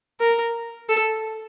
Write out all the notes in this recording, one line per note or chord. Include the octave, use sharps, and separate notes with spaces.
A#4
A4